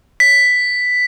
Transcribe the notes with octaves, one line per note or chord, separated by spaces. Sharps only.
B6